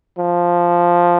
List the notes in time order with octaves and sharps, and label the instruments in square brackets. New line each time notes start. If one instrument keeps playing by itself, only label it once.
[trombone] F3